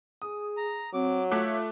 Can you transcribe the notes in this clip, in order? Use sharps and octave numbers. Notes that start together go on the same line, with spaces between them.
G#4 D#6
A#5
F#3 C4 D6
A3 F4 C#5 E5 D6 F#6